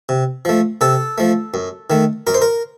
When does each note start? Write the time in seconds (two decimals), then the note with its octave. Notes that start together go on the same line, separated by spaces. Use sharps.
0.09 C3
0.45 F3 A3
0.81 C3 A4
1.18 F3 A3
1.54 F#2
1.90 D#3 A3
2.27 F#2 A#4
2.34 C5
2.42 A#4